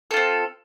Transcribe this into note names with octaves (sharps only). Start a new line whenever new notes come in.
C4 F4 A4